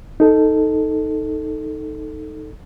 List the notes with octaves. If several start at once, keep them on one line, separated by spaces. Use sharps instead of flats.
D#4 A4